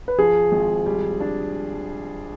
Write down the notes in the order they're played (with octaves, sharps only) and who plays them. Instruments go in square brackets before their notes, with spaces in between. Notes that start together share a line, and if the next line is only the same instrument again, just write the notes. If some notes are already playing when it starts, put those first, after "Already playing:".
[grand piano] B4
[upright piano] F3 [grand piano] G#4
[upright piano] G#1
G3
D4